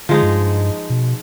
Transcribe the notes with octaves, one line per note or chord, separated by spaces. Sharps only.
D3 F3 G#3 D#4
G2
B2